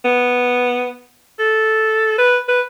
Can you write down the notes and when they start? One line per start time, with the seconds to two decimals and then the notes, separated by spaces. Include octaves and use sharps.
0.04 B3
1.39 A4
2.18 B4
2.48 B4